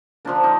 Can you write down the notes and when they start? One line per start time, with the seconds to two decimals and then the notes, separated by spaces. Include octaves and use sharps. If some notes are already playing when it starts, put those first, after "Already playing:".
0.25 D3 F3 A#3 D4
0.44 D#4